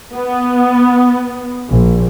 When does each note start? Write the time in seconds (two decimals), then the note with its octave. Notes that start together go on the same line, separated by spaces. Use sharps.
0.14 B3
1.70 A#1